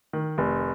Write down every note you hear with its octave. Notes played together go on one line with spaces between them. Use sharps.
D#3
F1